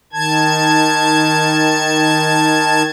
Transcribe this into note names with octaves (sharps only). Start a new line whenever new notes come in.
D#3 A5 G#6